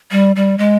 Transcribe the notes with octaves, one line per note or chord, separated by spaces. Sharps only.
G3
G3
G#3